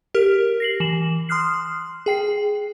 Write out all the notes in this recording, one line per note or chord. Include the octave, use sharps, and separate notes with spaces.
G4 A#4 F6
A#6 C7 F#7
E3 E7 F#7
C6 D#6 F6 F#6 C7
G#4 G5 C7